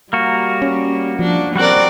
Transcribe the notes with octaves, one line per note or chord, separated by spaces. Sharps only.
G3 A#3 F#4
C#4
F3 D4
G3 C4 F#4 A#4 D5 F#5